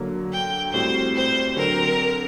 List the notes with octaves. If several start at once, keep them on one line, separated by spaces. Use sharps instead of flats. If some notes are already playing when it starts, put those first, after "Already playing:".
Already playing: D3 F#3 A#3
G5
A2 G3 C4 F#4 C5
C5
D3 F#3 C4 A#4